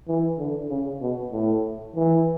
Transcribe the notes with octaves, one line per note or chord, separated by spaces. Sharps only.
E3
D3
C#3
B2
A2
E3